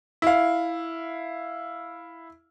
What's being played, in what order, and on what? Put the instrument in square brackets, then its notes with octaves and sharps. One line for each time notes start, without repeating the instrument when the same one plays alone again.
[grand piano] E4 F5